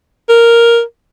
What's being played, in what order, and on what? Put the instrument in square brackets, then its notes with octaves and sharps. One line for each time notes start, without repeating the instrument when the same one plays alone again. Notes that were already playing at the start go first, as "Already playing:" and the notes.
[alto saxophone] A#4